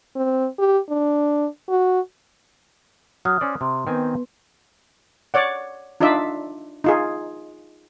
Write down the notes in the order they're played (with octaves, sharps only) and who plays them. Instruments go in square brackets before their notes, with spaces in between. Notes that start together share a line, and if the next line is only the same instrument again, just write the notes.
[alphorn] C4
G4
D4
F#4
[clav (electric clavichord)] F#3 [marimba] D#6 F6 F#6
[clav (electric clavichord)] C#4 C5 D5
[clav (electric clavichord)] C3 [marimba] C6
[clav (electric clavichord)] D#3 C4 G#5 [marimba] B3 B4
[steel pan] C#5 D5 F#5
D4 D#4 F4 D5 E5
D#4 F4 G#4